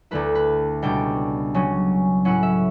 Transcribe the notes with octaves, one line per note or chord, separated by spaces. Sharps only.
D2 D3 A3 E4 B4
B4
C#2 B2 G3 D4 G5
C#3 F#3 C#4
A2 F#3 C#4 E4 F#5
E5